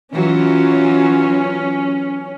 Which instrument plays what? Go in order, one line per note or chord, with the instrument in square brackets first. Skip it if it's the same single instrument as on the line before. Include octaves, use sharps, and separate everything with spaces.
[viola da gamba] E3 F#3 F4 [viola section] C#4